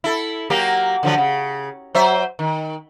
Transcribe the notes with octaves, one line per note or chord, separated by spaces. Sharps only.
E4 A4
F#3 A#3 G4
D3 F3 F#3
C#3
F#3 C5 E5
D#3